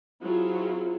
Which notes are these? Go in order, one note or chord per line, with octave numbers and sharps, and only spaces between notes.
F#3 C4 E4 F4 G#4